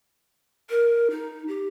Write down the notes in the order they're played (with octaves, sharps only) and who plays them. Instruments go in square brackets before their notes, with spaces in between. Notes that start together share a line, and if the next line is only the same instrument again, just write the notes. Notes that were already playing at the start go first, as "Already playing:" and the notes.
[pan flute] A#4
D#4
G4